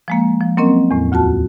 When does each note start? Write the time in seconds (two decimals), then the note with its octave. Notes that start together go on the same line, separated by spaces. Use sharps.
0.08 F3 G#3 A#3
0.41 F3
0.57 F#3 A#3 C4 C#4 A#4 D#5
0.91 E2 A2
1.12 D2 F4 F#4 A5